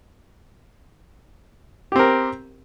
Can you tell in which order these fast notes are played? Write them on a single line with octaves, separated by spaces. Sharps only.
G4 C4 A#4